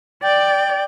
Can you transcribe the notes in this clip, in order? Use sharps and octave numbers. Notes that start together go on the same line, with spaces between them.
D5 G5